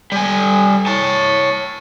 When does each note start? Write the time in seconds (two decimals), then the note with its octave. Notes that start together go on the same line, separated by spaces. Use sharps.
0.12 G3 G#5
0.87 C#5 A5